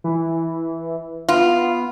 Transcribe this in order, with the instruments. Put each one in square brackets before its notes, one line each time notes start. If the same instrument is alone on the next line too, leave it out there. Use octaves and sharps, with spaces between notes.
[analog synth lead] E3
[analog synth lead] B3 [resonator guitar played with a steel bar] F4